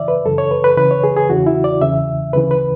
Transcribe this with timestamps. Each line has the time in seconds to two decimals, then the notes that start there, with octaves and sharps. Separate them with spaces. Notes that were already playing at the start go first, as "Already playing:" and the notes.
Already playing: C#2 C#3 E3 D5 E5
0.08 B4
0.25 F#2 C#3 E3 A4
0.38 C#5
0.51 B4
0.64 B4
0.77 C#2 C#3 E3 B4
0.91 C#5
1.04 G#4
1.17 G#4
1.29 E2 C#3 E3 F#4
1.47 E4
1.64 D5
1.81 E2 C#3 E3 E5
2.33 D2 C#3 E3 B4
2.51 B4